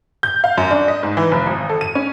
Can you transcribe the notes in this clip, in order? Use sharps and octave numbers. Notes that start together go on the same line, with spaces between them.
G6
F5
F#2
D4
D#5
G#2
E3
F1
G#1
A4
D#7
C#4